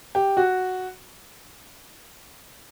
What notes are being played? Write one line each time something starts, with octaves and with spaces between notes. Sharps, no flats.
G4
F#4